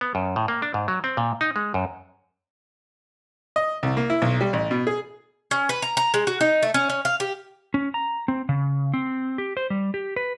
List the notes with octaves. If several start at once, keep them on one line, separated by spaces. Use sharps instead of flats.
B3
F#2
A2
A#3
D4
G#2
F#3
C4
A#2
D#4
G#3
F#2
D#5
C2
A#3
E4
B1
G3
A1
B2
G#4
C#4
B4
A#5
A#5
G#3
F#4
D#4
A3
C#4
C#4
F5
G4
C#4
A#5
C4
C#3
C4
G4
C5
G3
G4
B4